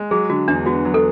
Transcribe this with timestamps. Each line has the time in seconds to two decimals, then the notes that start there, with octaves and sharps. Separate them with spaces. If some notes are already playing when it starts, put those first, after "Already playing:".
Already playing: G#3
0.11 F#3 G#4
0.30 D3 F#4
0.48 E2 D4
0.66 B3 F#4
0.85 F#3
0.94 A4